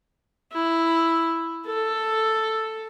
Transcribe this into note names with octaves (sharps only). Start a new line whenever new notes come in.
E4
A4